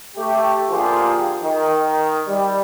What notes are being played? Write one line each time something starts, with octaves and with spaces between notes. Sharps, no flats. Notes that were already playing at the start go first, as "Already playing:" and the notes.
A3 G4
D3 F3 A#3 F4 G4 G#4
D#3
G3